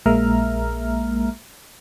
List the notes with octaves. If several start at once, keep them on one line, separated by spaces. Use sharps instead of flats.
A#1 G#3 A#3 E5 A#5 F6